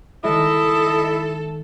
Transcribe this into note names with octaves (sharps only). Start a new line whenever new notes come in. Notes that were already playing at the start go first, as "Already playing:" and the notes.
D#3 G#3 E4 A4 D#5